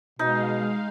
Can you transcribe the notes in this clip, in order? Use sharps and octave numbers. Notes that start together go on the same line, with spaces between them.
B2 G#3 D#4 F5